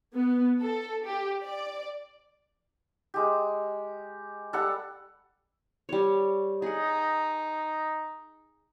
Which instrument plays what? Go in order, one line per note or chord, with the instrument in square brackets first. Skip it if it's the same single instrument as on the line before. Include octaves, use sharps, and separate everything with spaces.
[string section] B3
A4
G4
D5
[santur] G#3 G4
G3 A4 F#5
[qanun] G3 C#5
[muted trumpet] D#4 [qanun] G#4 F#5